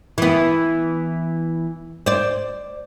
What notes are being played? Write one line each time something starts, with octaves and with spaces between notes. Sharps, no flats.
E3 B3
C5 D5